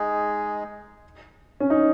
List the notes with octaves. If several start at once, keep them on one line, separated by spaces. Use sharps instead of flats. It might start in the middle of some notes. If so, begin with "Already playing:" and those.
Already playing: G#3 D#4 G#4
C#4
D#4